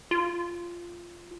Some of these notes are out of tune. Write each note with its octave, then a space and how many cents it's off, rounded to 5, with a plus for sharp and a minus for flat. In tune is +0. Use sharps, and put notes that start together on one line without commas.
F4 -10